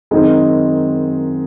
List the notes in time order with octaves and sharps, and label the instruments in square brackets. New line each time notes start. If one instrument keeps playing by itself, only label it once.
[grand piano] F#2 D#3 G#3 C4 D#4